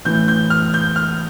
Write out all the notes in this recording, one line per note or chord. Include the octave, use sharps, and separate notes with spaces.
A2 E3 G6
G6
F6
G6
F6